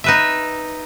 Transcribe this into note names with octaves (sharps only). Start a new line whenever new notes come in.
D#4 B4 E5